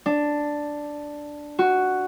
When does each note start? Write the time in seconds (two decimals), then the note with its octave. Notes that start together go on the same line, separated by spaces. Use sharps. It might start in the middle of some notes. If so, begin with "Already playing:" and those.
0.06 D4
1.59 F#4